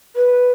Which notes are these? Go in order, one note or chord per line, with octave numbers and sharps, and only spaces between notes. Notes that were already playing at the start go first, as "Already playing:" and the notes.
B4